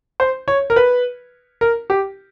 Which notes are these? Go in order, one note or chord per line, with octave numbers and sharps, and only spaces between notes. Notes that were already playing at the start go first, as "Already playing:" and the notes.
C5
C#5
A#4
B4
A#4
G4